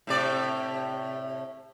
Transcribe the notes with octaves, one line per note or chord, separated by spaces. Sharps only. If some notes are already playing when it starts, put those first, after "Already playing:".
A2 C3 D5